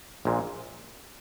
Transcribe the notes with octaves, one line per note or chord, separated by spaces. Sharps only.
A#1 A#2 G#3